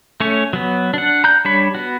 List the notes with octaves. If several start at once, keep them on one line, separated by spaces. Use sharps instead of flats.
A3 C#4 C#5
F#3 B3
D4 F#5
A#5 F#6 G6
G3 D4 C#5 B5
B3 F#4